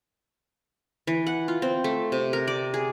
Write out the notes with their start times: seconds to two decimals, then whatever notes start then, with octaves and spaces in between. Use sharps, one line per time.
1.07 E3
1.27 F#5
1.48 F4
1.62 C4
1.84 A3
2.12 C3
2.33 A#4
2.48 D5
2.74 G#4